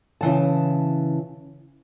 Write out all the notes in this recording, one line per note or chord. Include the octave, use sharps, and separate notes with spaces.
C#3 E3 A5